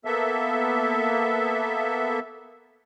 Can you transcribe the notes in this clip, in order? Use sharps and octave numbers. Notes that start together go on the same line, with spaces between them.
A#3 B3 A4 E5